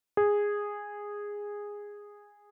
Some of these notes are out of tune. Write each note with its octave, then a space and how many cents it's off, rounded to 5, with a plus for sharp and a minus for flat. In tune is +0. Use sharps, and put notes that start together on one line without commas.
G#4 -10